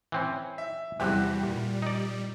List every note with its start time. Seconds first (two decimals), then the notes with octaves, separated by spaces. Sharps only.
0.12 E3 C4 C#4
0.58 E5
1.00 E2 C3 E3 G3 F#4 G4
1.43 A#2
1.82 D#4 D5